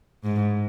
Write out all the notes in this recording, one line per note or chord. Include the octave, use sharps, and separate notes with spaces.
G#2